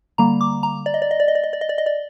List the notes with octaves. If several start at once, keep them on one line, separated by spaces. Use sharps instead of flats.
D3 G3 A#3 A#5
D6
A#5
D5
D#5
D5
D#5
D5
D#5
D5
D#5
D5
D#5
D5
D#5
D5